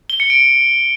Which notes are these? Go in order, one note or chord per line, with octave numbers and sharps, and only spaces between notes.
G7
C#7
D7